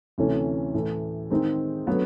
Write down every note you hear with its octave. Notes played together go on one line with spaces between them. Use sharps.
D2 C3 E3 A3 C#4
A2 E3 A3
D#3 G#3 C4 D#4 G#4
D3 F#3 B3